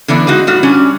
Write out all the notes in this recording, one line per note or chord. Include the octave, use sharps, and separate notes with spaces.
D3 E3 B3 D4
G#3 D#4 F#4
A2 G3 F#4
G3 C#4 D4